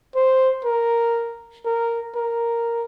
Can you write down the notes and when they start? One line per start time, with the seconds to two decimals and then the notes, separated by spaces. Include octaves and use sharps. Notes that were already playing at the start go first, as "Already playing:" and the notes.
0.15 C5
0.65 A#4
1.65 A#4
2.15 A#4